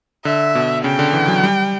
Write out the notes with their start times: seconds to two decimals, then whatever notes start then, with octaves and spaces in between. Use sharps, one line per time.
0.25 D3 E5
0.55 B2
0.84 C#3 G5
0.99 D3
1.13 E3
1.28 F#3
1.44 G3